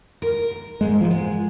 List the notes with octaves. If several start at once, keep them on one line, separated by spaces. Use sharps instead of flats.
A#4
A#4
G#2 G#3
F3
G#3